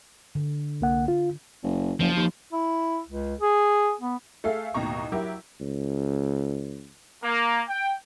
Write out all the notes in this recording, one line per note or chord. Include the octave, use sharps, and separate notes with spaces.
D3
C2 A#3 F#5
F4
F#1
F#1 F3
D#2
E4
C#2
G#4
B3
A3 G#4 A4 E5 F5
A1 D#2 B2 A#5 C#6
F#3 E4 G4 A#4
C#2
A#3
G5